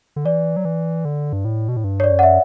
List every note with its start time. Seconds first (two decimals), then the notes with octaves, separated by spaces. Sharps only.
0.16 D3
0.25 E3 D5
0.57 F#3
0.65 E3
1.05 D3
1.33 G2
1.45 A2
1.69 B2
1.77 A2
1.84 G2
2.00 C#5
2.04 D5
2.11 F#2
2.19 F#5
2.23 E5